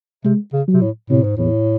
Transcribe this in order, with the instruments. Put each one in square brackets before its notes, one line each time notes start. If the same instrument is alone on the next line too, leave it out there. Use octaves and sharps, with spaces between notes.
[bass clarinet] C3 [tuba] G#3
[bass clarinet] C#3
[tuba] F#3
[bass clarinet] C3
A2
[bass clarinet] A2 [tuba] C3
[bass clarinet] G#2
[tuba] E2 [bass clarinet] A2